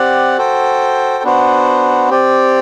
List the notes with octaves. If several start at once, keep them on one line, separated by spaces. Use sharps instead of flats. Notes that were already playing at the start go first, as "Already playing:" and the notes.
Already playing: C4 G4 D5 F#5
F#4 A4 C5 G5
B3 D4 F#4 C5
C4 G4 D5